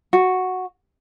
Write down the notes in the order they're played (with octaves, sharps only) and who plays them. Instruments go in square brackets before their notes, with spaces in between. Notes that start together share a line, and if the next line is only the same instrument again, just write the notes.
[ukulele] F#4